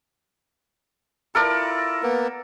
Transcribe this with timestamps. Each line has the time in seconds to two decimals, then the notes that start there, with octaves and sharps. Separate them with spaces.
1.35 E4 F4 A4 A#4 D5
2.03 A#3 B3